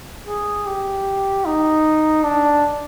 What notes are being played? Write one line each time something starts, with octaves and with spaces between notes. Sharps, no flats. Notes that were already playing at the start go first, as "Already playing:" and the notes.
G#4
G4
D#4
D4